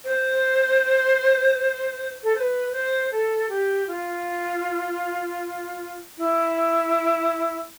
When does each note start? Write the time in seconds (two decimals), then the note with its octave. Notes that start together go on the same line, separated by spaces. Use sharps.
0.05 C5
2.24 A4
2.35 C5
2.40 B4
2.72 C5
3.12 A4
3.49 G4
3.88 F4
6.18 E4